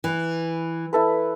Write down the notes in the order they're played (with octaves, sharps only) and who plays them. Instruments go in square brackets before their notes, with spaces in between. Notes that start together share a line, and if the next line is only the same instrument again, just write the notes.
[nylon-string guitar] E3
[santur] E4 A4 B4